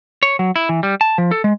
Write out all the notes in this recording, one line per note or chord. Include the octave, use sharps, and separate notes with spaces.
C#5
F#3
E4
E3
G3
A5
F3
A4
G#3